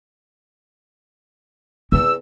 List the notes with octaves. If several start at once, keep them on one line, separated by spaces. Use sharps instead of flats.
E2 C4 E6